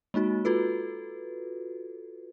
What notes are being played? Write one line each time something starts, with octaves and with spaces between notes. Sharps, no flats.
G#3 A#3 D#4 F#4
F4 F#4 A4 B4